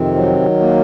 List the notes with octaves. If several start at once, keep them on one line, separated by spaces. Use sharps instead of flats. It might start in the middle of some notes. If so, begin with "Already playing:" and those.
Already playing: F2 C3 D#3 C4
F#3
A#3